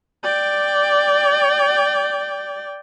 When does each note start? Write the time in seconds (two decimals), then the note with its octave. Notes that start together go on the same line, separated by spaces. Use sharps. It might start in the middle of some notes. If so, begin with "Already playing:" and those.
0.23 D5 G5